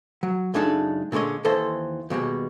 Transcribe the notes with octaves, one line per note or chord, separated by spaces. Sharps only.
F#3
C#2 F#2 G#3 D4 D#4 A4
A#2 D3 G#3 C#5 D#5
D#2 E3 A4 C5 D#5 C6
D#2 B2 G3 G#3